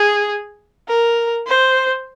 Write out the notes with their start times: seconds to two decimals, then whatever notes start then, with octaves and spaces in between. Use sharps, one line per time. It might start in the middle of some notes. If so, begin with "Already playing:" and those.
Already playing: G#4
0.89 A#4
1.47 C5